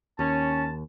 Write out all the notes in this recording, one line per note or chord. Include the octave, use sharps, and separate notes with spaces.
D#2 C#4 A5